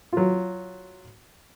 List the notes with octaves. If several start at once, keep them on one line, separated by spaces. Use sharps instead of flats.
F#3 F4